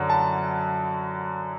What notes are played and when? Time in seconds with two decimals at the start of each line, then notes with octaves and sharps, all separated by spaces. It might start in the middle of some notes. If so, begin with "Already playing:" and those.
Already playing: F#2 D3 F#3
0.10 A5